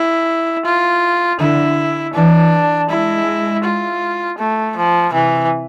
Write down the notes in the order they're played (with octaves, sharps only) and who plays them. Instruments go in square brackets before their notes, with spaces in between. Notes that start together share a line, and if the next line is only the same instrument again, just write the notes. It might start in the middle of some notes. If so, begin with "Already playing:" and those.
Already playing: [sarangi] E4
F4
[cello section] D3 [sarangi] E4
[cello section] E3 [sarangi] D4
[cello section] G#3 [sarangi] E4
[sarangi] F4
A3
F3
[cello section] C3 [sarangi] E3